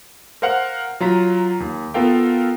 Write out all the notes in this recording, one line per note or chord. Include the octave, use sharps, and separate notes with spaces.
A#4 C5 F5 F#5 F6
F#3 F4 A#5 B6
D#2
B3 F4 A4 A#4 F5 G5